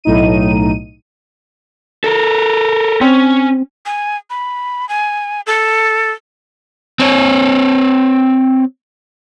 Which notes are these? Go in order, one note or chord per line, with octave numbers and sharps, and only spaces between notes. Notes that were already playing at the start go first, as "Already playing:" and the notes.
B1 A2 D#4 D#7
A4 A#4
C4 C#4
G#5
B5
G#5
A4
C4 C#5